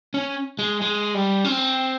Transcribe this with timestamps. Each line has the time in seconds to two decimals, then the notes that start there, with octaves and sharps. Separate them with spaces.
0.14 C#4
0.59 G#3
0.81 G#3
1.14 G3
1.44 C#4
1.48 C4